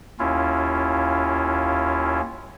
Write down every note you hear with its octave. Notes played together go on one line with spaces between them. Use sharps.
D#2 C#4 E4 F4